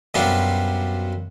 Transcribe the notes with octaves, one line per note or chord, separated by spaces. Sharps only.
F#2 B2 G3 C4 D4 F4